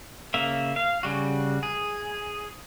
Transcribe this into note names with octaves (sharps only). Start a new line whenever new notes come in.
C#3 A#3 E5
F5
C#3 G3 F#4
G#4